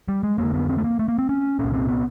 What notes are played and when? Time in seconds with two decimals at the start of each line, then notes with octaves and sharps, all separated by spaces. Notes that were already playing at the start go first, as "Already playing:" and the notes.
0.08 G3
0.23 G#3
0.38 F2 D3 A#3
0.54 B3
0.69 C4
0.78 A3
0.84 A#3
0.99 A3
1.08 A#3
1.19 C4
1.29 C#4
1.59 C2 A#2 C#4
1.73 C4
1.89 B3